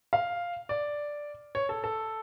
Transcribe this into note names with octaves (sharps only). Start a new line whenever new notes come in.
F5
D5
C#5
A4
A4